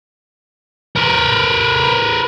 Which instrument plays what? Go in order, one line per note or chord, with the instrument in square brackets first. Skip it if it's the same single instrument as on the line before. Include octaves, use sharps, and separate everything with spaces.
[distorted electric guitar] A#4 B4